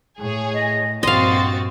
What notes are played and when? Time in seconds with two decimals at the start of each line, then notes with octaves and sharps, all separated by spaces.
0.19 A2 G#4 C#5
0.54 D#5
1.03 A#1 G2 C4 F#4 D#5 F5 C6 A6